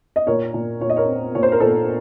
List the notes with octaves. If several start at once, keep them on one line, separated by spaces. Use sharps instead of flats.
D#5
A#2 A#4 C#5
A#2
A#2 C#5
D#5
A#4 C#5
C4
A#2 C#5
C5
A#4
A#2 A4 C5